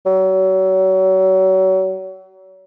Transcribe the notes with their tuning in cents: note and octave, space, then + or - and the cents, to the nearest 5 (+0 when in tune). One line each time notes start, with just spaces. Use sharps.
F#3 +35